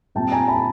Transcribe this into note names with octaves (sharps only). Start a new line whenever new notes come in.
A#2 G3 C4 G5 A5
G#5 A#5
A5 B5